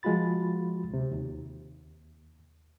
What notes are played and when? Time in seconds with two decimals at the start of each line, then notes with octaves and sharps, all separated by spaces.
0.03 F3 G#3 F4 F#4 B5 A6
0.90 D2 C3
1.11 D#2